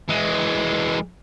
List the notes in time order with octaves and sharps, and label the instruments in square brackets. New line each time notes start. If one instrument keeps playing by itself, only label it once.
[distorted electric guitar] E3 G#3